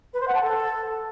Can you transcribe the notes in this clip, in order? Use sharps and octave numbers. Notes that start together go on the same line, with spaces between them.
B4
C5
F#5
A5
A4